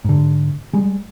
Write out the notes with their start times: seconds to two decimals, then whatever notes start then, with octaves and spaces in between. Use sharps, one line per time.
0.05 G#2 D3
0.73 G3 G#3